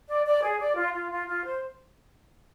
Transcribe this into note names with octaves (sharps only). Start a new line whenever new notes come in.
D5
D5
G#4
D5
F4
F4
F4
F4
C5